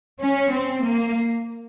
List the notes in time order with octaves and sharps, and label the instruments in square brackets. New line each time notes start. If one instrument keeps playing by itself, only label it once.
[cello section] C#4
C4
A#3